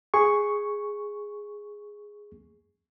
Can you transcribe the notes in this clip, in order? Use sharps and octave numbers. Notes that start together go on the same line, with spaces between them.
G#4 C#6